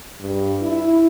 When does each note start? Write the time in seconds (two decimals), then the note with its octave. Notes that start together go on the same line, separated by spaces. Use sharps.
0.21 G2
0.61 E4